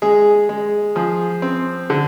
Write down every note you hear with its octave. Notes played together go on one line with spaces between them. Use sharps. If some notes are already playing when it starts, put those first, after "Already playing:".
G#3 G#4
G#3
F3 G#4
C4
D3